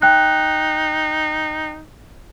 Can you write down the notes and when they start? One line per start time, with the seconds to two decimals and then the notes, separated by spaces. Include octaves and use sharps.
0.02 D#4 G5 F#6